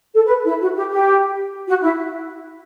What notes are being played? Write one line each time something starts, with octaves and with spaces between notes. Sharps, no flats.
A4
B4
E4
F#4
G4
G4
F#4
E4